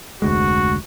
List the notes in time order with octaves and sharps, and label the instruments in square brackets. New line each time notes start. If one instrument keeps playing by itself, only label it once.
[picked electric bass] F1 D2 G#3 [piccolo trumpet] F#4